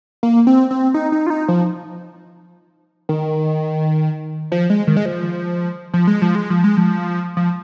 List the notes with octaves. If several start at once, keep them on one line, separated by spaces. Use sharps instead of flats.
A#3
C4
C4
D#4
D#4
F4
D#4
F3
D#3
F3
G#3
D#3
G#3
F3
F3
G#3
F3
G#3
F3
G#3
F3
F3